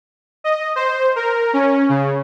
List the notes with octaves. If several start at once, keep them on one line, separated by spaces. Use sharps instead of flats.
D#5
C5
A#4
C#4
C#3